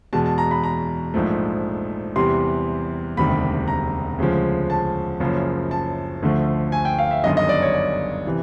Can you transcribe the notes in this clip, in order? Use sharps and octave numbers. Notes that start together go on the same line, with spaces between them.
E2 B2 G#3 A5
A5
A#5
B5
A#5
A#1 G#2 F3 A3
E2 C3 E3 G3 C6
E1 D2 C3 D#3 G3 B5
A#5
D2 C#3 F3 G#3
A5
F#1 F#2 C#3 F3
A5
D2 D3 F3 A3
G#5
G5
F5
E5
G1 F#2 D#3 D#5
D#5
D5
C#5
D5
C3 E3